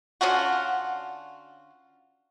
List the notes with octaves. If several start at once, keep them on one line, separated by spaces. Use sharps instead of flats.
D3 C#4 F4 F#4